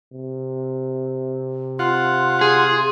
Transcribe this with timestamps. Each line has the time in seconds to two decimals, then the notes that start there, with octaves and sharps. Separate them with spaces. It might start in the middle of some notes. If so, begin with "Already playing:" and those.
0.14 C3
1.79 F4 F#5 C6
2.41 G#4